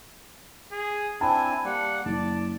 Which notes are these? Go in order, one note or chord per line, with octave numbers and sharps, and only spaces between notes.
G#4
C4 D4 E4 G#5 A5
G3 A#3 F#5
F#1 D5 A5